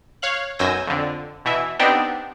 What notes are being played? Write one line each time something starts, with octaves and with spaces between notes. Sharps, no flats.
C#5 F5 F#6
B1 F#2 G#5 E6 G6 A#6
F2 D3
B2 E3 E5
B3 C4 D4 D#4 G4